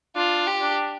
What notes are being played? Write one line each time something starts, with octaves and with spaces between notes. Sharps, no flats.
D4 F4
G4
D4